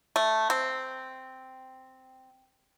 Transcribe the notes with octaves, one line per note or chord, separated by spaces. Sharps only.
A3
C4